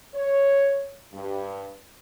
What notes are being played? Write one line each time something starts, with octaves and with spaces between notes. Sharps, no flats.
C#5
G2